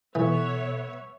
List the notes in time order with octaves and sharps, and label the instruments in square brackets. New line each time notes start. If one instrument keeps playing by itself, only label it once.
[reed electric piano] B2 A4 [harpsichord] E3 [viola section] B3 C#5 E5